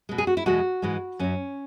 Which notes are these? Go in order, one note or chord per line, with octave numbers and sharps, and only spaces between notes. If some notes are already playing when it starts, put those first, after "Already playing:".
B2 G#3
G#4
F#4
E4
E2 B2 G#3 F#4
G#2 E3 G#3
F#2 F#3 C#4